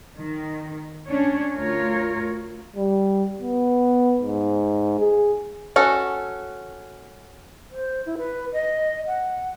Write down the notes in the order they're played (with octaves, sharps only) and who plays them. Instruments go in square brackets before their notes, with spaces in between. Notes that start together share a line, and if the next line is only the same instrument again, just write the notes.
[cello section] D#3
C#4 D4 C#5
D2 F4 A#4 C#5
[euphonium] G3
B3
G#2
G#4
[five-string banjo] C#4 F#4 A4
[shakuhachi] C5
E4
B4
D#5
F#5